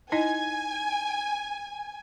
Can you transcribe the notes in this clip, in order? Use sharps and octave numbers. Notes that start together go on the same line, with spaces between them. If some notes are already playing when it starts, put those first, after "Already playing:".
D#4 E4 D#5 G#5